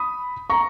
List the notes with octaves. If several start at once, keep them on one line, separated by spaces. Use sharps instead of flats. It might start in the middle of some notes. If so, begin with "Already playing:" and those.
Already playing: B5 D#6
A#5 C#6